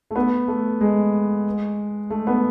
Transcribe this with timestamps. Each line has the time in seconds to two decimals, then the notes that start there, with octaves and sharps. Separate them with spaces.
0.11 A3
0.16 B3
0.48 A3
0.81 G#3
2.10 A3
2.27 B3